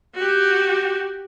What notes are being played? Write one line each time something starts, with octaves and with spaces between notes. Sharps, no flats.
F#4 G4